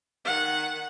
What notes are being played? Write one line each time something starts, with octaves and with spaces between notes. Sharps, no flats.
D#3 F#5